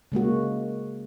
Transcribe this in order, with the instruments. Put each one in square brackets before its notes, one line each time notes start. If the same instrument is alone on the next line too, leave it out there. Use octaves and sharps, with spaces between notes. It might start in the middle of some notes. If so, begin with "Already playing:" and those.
[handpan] C#3 G#3 A#3 F#4